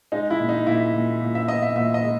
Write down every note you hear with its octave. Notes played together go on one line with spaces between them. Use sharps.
G#3 D#4
E4
A#2
D#4
A#2 E4
A#2
A#2
E5
B3 D#5
E5
A#2 E5
D#5
G#3